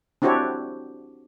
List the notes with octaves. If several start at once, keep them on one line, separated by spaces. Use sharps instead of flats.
C4 D4 E4 F#4 G4 C#5